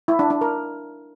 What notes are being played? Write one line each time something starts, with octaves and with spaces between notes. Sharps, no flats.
E4
D4
D4
A#4